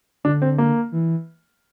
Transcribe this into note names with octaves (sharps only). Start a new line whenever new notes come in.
D3 D4
C4
A#3
E3